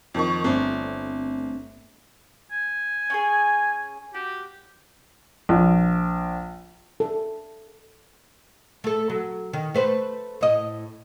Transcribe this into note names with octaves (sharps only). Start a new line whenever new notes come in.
F2 D#3 C#6
G1 A3 C4 D4
G#5
C#4 F#4 G#4
F#4 G4
A#1
A4
A3 A4
F#3
D#3
A3 B4 C5
A2 D#5